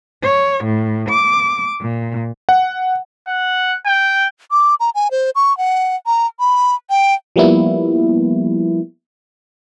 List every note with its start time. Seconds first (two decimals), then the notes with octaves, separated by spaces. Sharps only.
0.22 C#5
0.65 A2
1.09 D6
1.80 A#2
2.49 F#5
3.28 F#5
3.86 G5
4.51 D6
4.80 A#5
4.95 G#5
5.11 C5
5.36 C#6
5.58 F#5
6.06 A#5
6.40 B5
6.90 G5
7.36 F3 G3 A#3 B3 E4